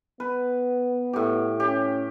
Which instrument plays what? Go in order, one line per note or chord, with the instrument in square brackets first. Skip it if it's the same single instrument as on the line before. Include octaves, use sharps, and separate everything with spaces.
[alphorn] B3 [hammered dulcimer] B4
[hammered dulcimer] A2 G4
[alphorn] C#4 [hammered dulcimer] G4